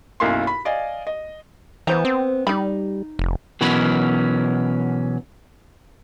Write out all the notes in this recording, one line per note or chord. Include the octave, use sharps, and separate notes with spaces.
B1 F#2 A#3 E4 F5 C6
B5
D5 D#5 F5 G#5
D#5
E3 B3 C5 A#5
C4
G3 D#4 B5
F1
B2 E3 F#3 C#4 A#4 B5